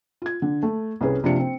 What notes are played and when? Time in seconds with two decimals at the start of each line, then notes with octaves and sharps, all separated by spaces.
0.22 F4 G#6
0.42 D3
0.63 A3
1.01 C2 C#4 G#4 B4
1.23 F#1 C3 F3 D4 F4 C#7
1.39 C4